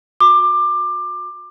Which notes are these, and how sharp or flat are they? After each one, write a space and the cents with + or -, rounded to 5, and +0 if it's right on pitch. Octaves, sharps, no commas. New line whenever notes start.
F#4 -35 D6 +20